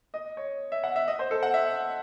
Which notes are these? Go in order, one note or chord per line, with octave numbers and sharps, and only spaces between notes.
D#5
C#5
E5
F#5
E5
D#5
C5
A4
F#5
E5